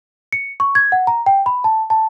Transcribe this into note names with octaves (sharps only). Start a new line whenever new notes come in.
C#7
C#6
G#6
F#5
A#5
G5
B5
A5
A5